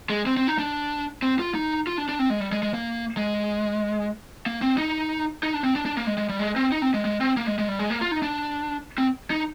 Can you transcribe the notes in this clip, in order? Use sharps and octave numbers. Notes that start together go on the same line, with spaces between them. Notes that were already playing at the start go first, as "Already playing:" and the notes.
G#3
C4
C4
D#4
D4
C4
F4
D#4
F4
D4
D4
C4
G#3
G3
G#3
G#3
A#3
G#3
A#3
C4
D#4
D#4
D4
C4
D4
D4
A#3
G#3
G#3
G3
G#3
C4
D#4
C4
G#3
G#3
C4
A#3
G#3
G#3
G3
G#3
A#3
F4
D#4
D4
C4
D#4